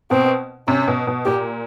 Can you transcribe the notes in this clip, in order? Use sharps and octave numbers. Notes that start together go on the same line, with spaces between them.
B2 C4
C3 C#4
B2
B2
A#2 G4